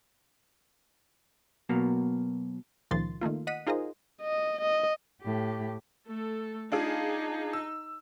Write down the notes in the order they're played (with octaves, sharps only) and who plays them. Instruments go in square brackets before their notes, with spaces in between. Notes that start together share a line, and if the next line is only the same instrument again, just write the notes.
[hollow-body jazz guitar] B2 F#3 A#3
[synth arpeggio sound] C#2 A#2 D#3 F3 C6 A6
D#3 A3 A#3 F4
D#5 F#5 B6 D#7
D#4 F4 G#4 A#4 C5 D#5
[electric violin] D#5
D#5
[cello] A2 G4
[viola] A3 A4
[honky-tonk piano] D4 F4 G#4 [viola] D#4
[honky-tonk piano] E6